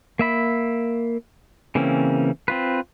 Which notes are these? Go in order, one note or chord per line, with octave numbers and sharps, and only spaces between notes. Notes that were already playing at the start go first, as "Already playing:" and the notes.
A#3 E5 B5
C#3 E3 A#3 C4 C#4
C4 F4 B4